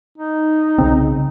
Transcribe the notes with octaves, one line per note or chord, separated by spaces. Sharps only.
D#4
C2 C#3 C4